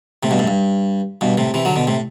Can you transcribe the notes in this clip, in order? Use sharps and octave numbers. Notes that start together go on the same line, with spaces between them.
A2 C3
G2 B2
F#2 A2
G2
G2 B2
A2 C3
C3 E3
D3 F#3
B2 D3
A2 C3